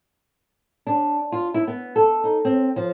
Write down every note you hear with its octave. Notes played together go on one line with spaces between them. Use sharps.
D4
F4
E4
B3
A4
D#4
C4
F3